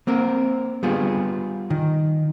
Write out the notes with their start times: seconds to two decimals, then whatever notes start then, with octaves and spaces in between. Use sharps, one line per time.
0.07 A#3 C4 A#4
0.83 G3 B3 F4 G#4
1.70 D#3